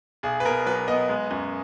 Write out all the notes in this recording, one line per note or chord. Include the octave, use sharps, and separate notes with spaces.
B1 G#4
B4
B2 A#4
F#3 B4
B3 D#5
G#3
F#2